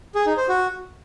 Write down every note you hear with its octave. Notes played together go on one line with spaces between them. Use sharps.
G#4
D#4
C5
F#4